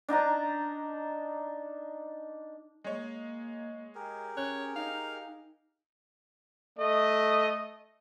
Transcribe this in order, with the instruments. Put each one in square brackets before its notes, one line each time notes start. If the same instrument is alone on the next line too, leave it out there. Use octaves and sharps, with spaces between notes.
[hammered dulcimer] D4 D#4 A5 A#5
[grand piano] G#3 C#5 [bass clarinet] A#3
[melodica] G4 G#4 A#4
[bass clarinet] C#4 [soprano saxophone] C#5 [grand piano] F#6
[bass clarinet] D#4 [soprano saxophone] F5
[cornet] A3 [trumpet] D#5